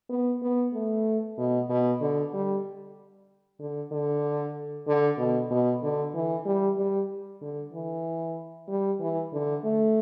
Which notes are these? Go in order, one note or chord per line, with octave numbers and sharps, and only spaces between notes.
B3
B3
A3
B2
B2
D3
G3
D3
D3
D3
B2
B2
D3
E3
G3
G3
D3
E3
G3
E3
D3
A3